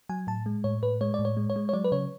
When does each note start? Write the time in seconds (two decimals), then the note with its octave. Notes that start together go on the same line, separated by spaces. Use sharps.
0.09 F#3 G#5
0.27 A2 A5
0.46 G#3
0.64 A2 C#5
0.83 A2 B4
1.01 G#3 C#5
1.14 A2 D5
1.25 C#5
1.37 G#3
1.50 C#5
1.56 G#3
1.69 C#5
1.73 F#3 D5
1.84 B4
1.92 C#3 C#5